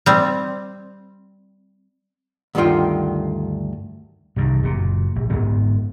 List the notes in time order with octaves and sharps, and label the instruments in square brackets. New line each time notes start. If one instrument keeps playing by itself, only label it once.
[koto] G3 C4
[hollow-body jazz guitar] D2 G2 D3 D#3 F4 G5
[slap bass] C2 G2 D#3
F#1 A#2
A#1
G1 F2 G#2 B3